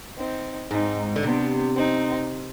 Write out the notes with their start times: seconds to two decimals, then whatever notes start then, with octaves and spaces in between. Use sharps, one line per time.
0.18 C4 D#4
0.71 G#2 C4 D#4
1.16 D3
1.23 C3 B3 D4
1.76 C4 D#4